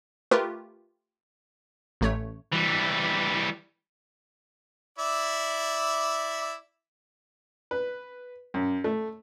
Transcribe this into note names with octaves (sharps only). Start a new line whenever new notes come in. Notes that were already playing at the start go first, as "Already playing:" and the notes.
A3 F4 G4 A#4 B4
A1 A3 C#5
E3 G3
E4 D5 E5
B4
F#2
A3